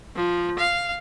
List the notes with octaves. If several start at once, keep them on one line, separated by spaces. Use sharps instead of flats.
F3
F5